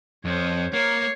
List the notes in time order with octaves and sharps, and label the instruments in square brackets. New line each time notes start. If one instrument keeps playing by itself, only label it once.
[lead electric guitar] F2 [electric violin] C5 C#5
[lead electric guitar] A#3 [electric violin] C#5 C7